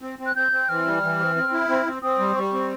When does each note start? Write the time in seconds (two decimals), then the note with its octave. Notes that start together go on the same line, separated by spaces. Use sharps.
0.02 C4
0.19 C4
0.26 F#6
0.36 C4 G6
0.52 C4
0.69 E3 F6
0.86 G3
1.03 E3
1.19 C4
1.36 C4
1.52 E4
1.69 C4
1.86 C4
2.02 C4 D#6
2.19 G3
2.36 G3 C#6
2.53 C4